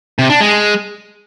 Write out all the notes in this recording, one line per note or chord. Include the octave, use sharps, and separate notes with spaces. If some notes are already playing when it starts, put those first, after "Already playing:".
C3
D4
G#3